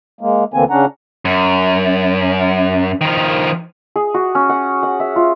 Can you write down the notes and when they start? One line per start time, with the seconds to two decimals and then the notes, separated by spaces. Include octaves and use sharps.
0.21 G#3 A#3
0.54 D2 D3 E3 A#3 C4 G#5
0.70 C#3 C#4 D4 F#5 A#5
1.25 F#2
3.01 D#3 F3
3.96 G#4
4.14 F#4
4.35 C#4
4.49 F#5
4.83 F#5
5.00 E5
5.16 F4